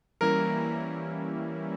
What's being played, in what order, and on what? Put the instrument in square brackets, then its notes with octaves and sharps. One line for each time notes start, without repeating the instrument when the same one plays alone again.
[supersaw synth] E3 G3 A#3 C#4 E4 [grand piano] A#4